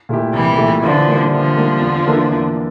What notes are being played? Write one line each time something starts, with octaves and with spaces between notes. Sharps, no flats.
A#2 A3 E4 G4
C2 E3 G3
A#2 A3 E4 G4
D3 E3 F3
G3 A#3
D3 E3 F3
G3 A#3
E2
E3 A#3 D4 A4
E2